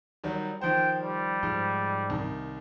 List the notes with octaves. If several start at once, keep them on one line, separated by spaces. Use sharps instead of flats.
D#3 F#3 G3
D#3 F3 C5 G5
G3
G#2 F3
C2 D#3